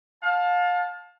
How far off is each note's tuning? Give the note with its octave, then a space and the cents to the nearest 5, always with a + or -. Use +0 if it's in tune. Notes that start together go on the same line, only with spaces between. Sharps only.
F5 +30 A5 -5